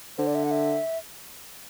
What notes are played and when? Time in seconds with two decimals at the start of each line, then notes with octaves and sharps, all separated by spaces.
0.18 D3 C5
0.27 D5
0.35 E5
0.44 F#5
0.51 E5